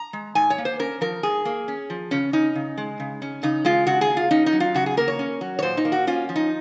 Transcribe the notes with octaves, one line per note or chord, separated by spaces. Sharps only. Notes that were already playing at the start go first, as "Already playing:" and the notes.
Already playing: A#5
G#3
G#2 G#5
C#5
A#3
C5
C#4 A#4
F3 A#4
G#2 G#4
A#3
C#4
F3
C#3 C#4
C#4 D#4
C#3
G#3
C#3
C#4
C#3 D#4
G#3 F4
C#3 F#4
G#4
A#3
F4
C#4 D#4
D#4
F#3
F4
C#3 F#4
G#4
A#3 A#4
C#5
C#4
F#3
C#5
A#2 C5
D#4
A#3
F#4
C#4 F4
F3
D#4